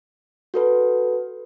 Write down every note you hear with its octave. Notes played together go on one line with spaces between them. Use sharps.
F#4 A4 B4